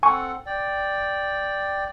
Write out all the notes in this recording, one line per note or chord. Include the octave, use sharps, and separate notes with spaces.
C4 A4 F#5 G#5 C#6
D5 G5